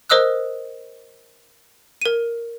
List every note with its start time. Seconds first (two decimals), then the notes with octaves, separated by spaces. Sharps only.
0.10 A#4 C5 D#5 D#6 E6 F#6
2.01 A#4 D#7